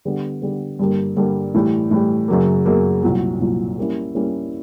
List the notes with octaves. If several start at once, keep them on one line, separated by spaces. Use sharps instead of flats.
D3 G3 B3
D3 G3 B3
G2 D3 G3 A#3
G2 D3 G3 A#3
A2 E3 G3
A2 E3 G3
F#2 C#3 F#3 A#3
F#2 C#3 F#3 A#3
C2 A#2 F#3
C2 A#2 F#3
G3 A#3 C#4 E4
G3 A#3 C#4 E4